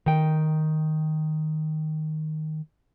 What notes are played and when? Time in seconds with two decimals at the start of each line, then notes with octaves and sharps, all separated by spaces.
0.06 D#3 G5